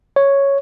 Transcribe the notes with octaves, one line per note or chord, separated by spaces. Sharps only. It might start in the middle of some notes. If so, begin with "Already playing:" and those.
C#5